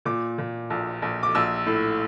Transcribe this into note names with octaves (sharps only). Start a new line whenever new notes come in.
A#2 D6
A#2
A#1
A#1
D6
A#1 E6
A2